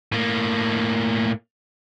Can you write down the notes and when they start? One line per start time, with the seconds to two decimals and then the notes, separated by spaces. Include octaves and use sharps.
0.12 A2 A#3